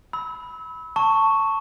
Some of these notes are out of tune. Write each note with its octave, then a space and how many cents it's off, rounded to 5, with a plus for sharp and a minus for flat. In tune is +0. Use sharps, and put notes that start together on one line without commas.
B5 +0 E6 -30
A5 +15 C#6 +0